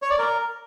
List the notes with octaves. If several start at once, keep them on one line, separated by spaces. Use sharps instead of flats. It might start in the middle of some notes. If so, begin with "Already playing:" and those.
C#5
D5
A#4